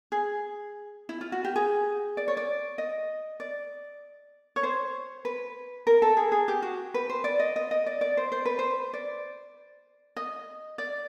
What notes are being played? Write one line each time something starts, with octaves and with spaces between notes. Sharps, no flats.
G#4
E4
F4
F#4
G4
G#4
D5
C#5
D5
D#5
D5
C#5
C5
B4
A#4
A4
G#4
G#4
G4
F#4
B4
C5
D5
D#5
D#5
D#5
D5
D5
C5
C5
B4
C5
D5
D#5
D5